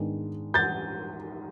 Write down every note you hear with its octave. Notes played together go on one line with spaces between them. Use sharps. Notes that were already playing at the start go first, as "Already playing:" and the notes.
Already playing: G#2 D#3 G#3 B3 D4
G6 A6